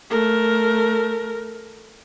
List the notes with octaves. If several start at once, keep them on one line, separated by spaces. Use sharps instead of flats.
A3 A#4